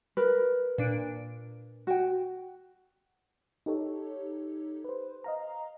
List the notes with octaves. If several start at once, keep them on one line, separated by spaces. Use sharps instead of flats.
A#4 B4
A#2 D4 D7
F#4 G5
D#4 G4 A4 C#5
B4 C5
D#5 F5 A#5